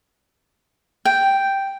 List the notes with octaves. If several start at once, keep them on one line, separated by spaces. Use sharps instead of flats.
G5